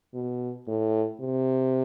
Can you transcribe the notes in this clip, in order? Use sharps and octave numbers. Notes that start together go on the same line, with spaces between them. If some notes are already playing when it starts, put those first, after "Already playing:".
B2
A2
C3